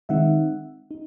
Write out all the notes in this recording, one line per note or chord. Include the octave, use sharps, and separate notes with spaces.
D#3 G#3 C4 D#4 E5 F#5
D#4